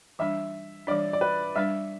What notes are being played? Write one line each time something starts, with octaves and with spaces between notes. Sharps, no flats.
E3 G3 D4 E5
E3 G3 D4 D5
D5
B4
G3 D4 B4 E5